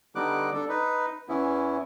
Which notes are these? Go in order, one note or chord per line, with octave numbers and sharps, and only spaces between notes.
D3 G3 B3 D#4 D6 F#6
D4 A4
D#4 B4
E2 E3 B3 C#4 E4